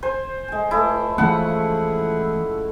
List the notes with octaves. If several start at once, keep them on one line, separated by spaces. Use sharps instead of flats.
C5 G#5
G#3 G#5
C#2 G#3 A3 E4
C#3 E3 F3 G#3 A3 E4 G#4 F#5